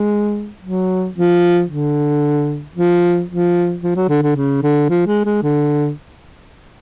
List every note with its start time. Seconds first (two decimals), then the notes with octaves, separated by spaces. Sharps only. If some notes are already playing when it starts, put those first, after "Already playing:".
Already playing: G#3
0.62 F#3
1.16 F3
1.69 D3
2.76 F3
3.29 F3
3.83 F3
3.96 F#3
4.09 D3
4.22 D3
4.36 C#3
4.63 D3
4.89 F3
5.07 G#3
5.25 G#3
5.43 D3